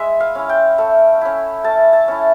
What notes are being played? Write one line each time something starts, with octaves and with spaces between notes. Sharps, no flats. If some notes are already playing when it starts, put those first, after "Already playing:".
Already playing: G#3 E4 E5
F5
C#4 E4
G5
A3
C#4 E4
A3 A5
A5
C#4 E4